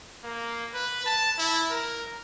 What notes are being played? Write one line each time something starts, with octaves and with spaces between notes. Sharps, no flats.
A#3
B4
A5
E4
A#4